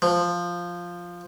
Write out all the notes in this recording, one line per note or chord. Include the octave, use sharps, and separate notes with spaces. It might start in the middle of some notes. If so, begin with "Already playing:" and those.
F3